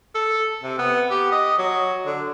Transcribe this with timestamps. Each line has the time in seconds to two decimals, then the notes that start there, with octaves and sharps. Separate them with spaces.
0.15 A4
0.63 C3
0.79 B3
1.11 G4
1.32 D#5
1.59 F#3
2.06 D3